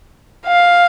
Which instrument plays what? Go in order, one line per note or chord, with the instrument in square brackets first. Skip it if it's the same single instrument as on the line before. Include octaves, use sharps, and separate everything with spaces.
[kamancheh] F5